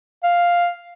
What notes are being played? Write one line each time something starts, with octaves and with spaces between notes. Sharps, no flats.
F5